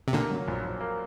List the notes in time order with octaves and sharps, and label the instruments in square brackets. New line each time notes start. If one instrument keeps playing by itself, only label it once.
[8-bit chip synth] C3
[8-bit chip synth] A#2 D3 [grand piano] A#3
[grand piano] F#3
A#1
A#1
A#3